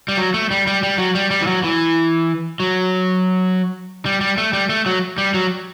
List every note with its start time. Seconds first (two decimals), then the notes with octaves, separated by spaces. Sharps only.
0.08 G3
0.18 F#3
0.34 A3
0.51 G3
0.67 G3
0.83 G3
0.98 F#3
1.15 G3
1.31 G3
1.42 E3
1.47 F#3
1.64 E3
2.60 F#3
4.06 G3
4.21 G3
4.38 A3
4.53 G3
4.69 A3
4.86 F#3
5.18 G3
5.34 F#3